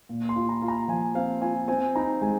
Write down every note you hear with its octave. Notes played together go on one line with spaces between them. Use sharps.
A#2
C6
F4
A#5
F4
A#5
F3 G#5
C4 F5
F4 G#5
C4 G#5
D#4 A#5
G#3 G#5